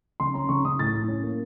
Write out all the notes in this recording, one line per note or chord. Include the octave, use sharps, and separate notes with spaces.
C#3 C6
C#4 A#5
C#3 C#6
C#3 D#6
A2 A6
A2
C#4
A#3